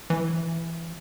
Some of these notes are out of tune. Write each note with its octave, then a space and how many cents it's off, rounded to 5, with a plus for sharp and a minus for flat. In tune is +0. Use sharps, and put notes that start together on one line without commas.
E3 +15